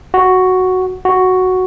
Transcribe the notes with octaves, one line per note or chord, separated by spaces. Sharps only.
F#4
F#4